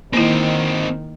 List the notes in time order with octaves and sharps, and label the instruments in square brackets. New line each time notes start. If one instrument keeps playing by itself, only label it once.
[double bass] D#3 [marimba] A#3 E4 [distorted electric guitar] C4 D#4